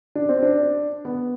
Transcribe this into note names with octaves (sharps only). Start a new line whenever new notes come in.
D4
C4
D4
B3